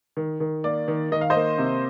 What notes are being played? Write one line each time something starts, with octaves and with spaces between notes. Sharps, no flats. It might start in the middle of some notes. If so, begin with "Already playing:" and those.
D#3
D#3
A#3 D5
D#3
D#3 D#5
F5
A#3 C5 D#5
C3